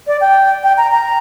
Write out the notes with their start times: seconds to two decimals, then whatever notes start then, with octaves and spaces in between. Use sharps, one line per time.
0.07 D5
0.21 G5
0.63 G5
0.77 A#5
0.91 A#5